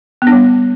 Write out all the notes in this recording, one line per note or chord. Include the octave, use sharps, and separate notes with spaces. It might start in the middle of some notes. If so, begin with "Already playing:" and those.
B3
D4
G3